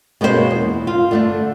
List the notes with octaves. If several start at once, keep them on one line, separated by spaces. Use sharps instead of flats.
B2 G#3 A#3 C#4 F#4 C5
E2
F4
D3 A3 D4